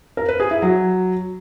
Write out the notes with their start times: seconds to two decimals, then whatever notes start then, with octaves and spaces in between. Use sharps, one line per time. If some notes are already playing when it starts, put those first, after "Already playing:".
0.17 A#4
0.28 B4
0.40 G#4
0.51 E4
0.62 F#3